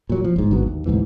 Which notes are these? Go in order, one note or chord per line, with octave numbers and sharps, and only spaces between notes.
A#2 F#3
F3
G1 G#2
G#1 D3 F#3 B3
D#2
D2 G#2 C3 E3